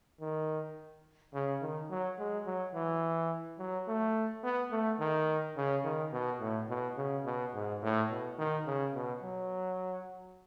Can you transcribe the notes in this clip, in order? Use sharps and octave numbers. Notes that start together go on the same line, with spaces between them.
D#3
C#3
D#3
F#3
G#3
F#3
E3
F#3
A3
B3
A3
D#3
C#3
D#3
B2
A2
B2
C#3
B2
G#2
A2
B2
D#3
C#3
B2
F#3